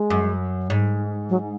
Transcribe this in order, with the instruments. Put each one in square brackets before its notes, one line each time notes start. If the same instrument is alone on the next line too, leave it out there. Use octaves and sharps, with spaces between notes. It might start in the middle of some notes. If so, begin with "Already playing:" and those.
Already playing: [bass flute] G#3
[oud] F#2
G#2
[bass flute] F#3